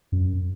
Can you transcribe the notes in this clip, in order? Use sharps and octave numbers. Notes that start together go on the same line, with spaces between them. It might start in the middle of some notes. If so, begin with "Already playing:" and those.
F#2